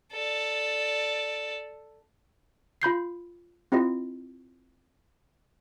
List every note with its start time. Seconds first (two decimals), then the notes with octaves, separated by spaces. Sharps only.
0.12 A4 D5
2.82 F4 B5 G6 C7
3.72 C4 E4 F4 G4 D#5